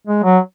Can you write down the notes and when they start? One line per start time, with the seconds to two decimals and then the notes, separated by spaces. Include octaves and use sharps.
0.07 G#3
0.24 F#3